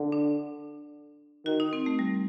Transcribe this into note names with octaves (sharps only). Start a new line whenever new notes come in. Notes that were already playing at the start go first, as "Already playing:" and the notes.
Already playing: D3
D4
D#3 F#4
D#4
C4
A3
G3